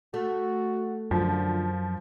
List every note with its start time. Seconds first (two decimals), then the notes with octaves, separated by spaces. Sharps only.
0.14 A3 F#4
1.11 F#2 D3 F3